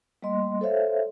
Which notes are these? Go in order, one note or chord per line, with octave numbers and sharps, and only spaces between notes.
G3 A3 A#3 D#5 C6
A4 C5 C#5 E5 F5